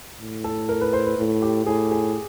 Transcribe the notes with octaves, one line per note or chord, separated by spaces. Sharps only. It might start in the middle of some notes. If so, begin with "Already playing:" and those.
A2
A4
A#4
B4
C5
B4
A2
G4
A2 G#4
G#4